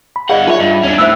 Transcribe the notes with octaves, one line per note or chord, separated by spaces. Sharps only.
B5
G2 G#4 D5 D#5 F5 F#5
D#4 F4 B4 C#5 E5
G2 D#5
D#2 C#4 D4
A2 C5 E5 E6 F#6